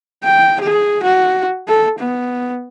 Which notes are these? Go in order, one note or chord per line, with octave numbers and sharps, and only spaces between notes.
G5
G#4
F#4
A4
B3